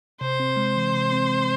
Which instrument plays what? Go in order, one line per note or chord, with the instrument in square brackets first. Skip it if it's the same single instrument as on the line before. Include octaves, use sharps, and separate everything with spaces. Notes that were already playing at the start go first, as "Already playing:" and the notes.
[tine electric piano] C3 [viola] C5
[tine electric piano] C4
G#3
E3
C3
C4
G#3